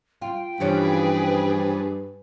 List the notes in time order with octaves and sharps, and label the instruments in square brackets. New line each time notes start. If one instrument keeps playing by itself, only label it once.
[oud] F4 [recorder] G5
[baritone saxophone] G2 [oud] E3 F3 C#4 [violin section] G#4 B4